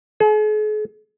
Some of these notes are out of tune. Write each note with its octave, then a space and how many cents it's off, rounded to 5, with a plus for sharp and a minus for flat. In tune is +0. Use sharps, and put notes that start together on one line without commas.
G#4 +45